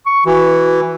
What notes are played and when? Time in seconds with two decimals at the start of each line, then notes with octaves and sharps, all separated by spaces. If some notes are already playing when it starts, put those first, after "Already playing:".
0.06 C#6
0.26 E3 F#4